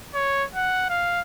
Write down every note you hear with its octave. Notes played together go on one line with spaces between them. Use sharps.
C#5
F#5
F5